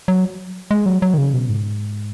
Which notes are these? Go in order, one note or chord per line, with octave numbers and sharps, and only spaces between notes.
F#3
G#3
F#3
F#3
D#3
C#3
B2
G#2